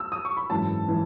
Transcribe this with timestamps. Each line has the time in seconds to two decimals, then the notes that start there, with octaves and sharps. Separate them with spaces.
0.00 E6
0.12 D#6
0.25 C#6
0.37 B5
0.50 G#1 F#2 E3 A5
0.88 E3